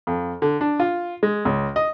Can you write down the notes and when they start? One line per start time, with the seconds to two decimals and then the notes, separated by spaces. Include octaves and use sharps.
0.07 F2
0.42 D3
0.61 D4
0.80 F4
1.23 G#3
1.45 C#2
1.76 D#5